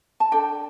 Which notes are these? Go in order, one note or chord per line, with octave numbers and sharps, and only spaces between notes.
A5
D4 A4 G5